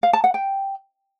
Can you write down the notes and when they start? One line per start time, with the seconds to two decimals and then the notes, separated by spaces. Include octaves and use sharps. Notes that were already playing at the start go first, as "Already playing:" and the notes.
0.03 F5
0.13 A5
0.24 F#5
0.34 G5